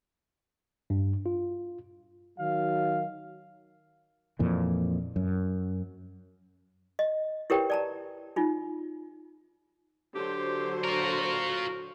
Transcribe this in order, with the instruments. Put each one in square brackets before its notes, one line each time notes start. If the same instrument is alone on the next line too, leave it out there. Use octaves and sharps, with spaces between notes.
[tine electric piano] G2
F4
[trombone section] D#3 F#3 [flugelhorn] F5
[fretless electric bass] F2 A#2 E3
F#2
[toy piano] D#5
E4 G4 A#4 B4 C#5 G5
D5 A5 A#5
D#4 F4
[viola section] D3 F#3 C5 [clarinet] G4
[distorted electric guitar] F4 A#4 [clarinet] F#4